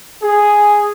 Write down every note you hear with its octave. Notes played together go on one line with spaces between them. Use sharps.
G#4